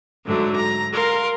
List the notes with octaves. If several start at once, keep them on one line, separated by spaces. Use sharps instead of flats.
G#2 D3 F#3 A3
A#5
A#4 F5 C6